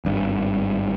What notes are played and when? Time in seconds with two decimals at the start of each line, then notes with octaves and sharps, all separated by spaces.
0.05 G#1 G2